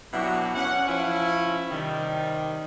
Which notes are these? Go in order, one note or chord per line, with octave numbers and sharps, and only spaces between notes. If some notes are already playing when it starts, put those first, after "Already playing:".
B2 F#3 D4 E4 F#4 G4
C#4 F#5
F3 C#4 E4
C3 D#3 G3